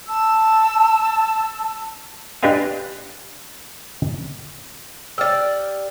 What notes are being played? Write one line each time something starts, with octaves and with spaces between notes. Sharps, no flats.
A5 E6
D4 G4 B4 D#5 F5 G#5
G4 D5 E6 F6 A6